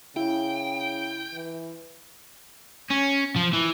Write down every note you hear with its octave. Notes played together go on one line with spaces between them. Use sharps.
C#3 E4 G5
E3
C#4
F3
E3